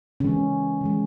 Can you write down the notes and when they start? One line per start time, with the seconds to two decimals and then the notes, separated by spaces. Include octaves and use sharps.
0.20 C#3 E3 G#3 C#4
0.81 C#3 E3 G#3